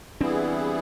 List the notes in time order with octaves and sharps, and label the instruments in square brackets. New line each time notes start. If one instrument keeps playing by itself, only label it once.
[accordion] E3 G3 B3 E4 G#4 [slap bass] C4 D4